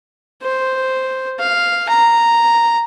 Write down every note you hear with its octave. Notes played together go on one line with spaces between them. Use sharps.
C5
F5
A#5